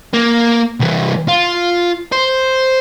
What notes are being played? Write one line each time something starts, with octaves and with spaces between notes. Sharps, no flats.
A#3
C2 E3
F4
C5